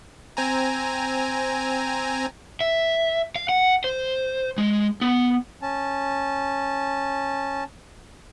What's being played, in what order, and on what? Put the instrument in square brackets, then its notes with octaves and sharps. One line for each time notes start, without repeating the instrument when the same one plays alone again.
[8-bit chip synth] C4 G#5 A#5
[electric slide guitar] E5
F5
F#5
C5
G#3
B3
[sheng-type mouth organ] C#4 A5